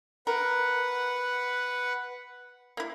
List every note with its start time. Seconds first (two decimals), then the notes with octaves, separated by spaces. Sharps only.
0.27 A#4 B4 F#5
2.77 A#3 E4